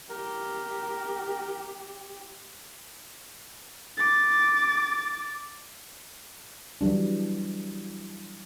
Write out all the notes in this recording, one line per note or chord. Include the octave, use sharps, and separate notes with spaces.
G4 A#4
D6 A6
E3 F#3 G3 D4